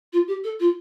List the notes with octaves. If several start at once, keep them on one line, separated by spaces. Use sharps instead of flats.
F4
G4
A4
F4